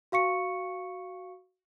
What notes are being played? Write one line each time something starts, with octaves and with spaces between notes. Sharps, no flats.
F#4 F5 C#6 C#7